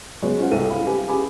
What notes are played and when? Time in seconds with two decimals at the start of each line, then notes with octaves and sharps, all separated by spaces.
0.22 C#3 F#3 G#3 B3 C#5
0.39 C#4 F4 C5 F#5
0.51 C2 G#2 A4 D#7
0.70 E4 F5 B5
0.87 G4 B4 F5 G#5
1.08 G4 G#4 G#5 B5 D6